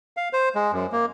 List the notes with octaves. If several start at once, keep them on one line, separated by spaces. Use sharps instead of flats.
F5
C5
G#3
F#2
A#3